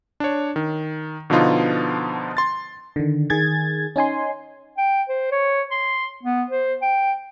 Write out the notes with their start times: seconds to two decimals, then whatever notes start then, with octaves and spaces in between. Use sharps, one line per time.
0.20 D4 C#5
0.56 D#3
1.30 B2 D3 F3 B3 D#4 F4
2.37 C6 A6
2.96 D3 D#3
3.30 D#3 G#4 G#6 A6
3.96 C#4 D#4 G#5 C6
4.78 G5
5.09 C5
5.31 C#5
5.71 C6
6.23 B3
6.50 C5
6.82 G5